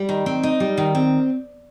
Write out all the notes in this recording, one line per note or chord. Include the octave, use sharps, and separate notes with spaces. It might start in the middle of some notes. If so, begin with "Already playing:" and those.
Already playing: G3
D#3
C4
D#4
G3
D#3
C4